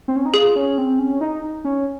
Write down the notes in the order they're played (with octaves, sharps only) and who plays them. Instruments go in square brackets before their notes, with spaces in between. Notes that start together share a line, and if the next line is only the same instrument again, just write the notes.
[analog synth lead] C4
C#4
D#4
[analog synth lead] F4 [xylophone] G#4
[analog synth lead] C#4
C4
C#4
D#4
C#4